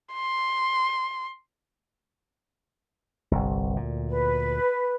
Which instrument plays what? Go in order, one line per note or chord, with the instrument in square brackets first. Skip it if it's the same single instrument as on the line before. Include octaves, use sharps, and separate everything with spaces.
[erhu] C6
[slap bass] G1 C2
D2 A#2
[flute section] B4